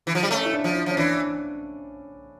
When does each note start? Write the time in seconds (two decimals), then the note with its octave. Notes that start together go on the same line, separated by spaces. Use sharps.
0.07 E3
0.15 F3
0.23 G3
0.31 A3 C#4
0.46 E4
0.53 D4
0.64 F3
0.75 E4
0.86 F3 C#4
0.97 E3 D4